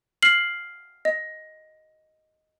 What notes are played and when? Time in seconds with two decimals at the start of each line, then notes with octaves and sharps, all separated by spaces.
0.23 F6 C7 F#7
1.05 D#5